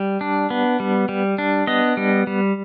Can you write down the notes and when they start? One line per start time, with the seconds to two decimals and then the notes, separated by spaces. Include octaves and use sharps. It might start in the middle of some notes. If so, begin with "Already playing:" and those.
Already playing: G3
0.21 D4
0.50 B3
0.80 G3
1.09 G3
1.38 D4
1.67 B3 D#5
1.97 G3
2.27 G3